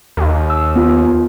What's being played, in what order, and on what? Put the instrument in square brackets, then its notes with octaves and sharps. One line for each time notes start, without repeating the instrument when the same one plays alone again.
[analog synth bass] D#2
[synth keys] E6
B3 F4